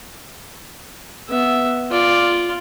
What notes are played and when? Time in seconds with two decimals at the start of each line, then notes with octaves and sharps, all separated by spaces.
1.29 B3 E5
1.91 F4 D5